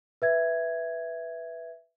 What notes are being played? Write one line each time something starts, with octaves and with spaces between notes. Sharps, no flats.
B4 E5 G#6